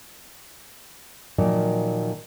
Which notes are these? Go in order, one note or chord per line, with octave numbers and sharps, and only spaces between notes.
A#2 D#3 F3 F#3 A#3